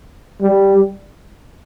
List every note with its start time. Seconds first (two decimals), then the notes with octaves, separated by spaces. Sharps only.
0.42 G3